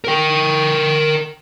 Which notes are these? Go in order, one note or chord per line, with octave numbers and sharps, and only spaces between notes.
A#4 G5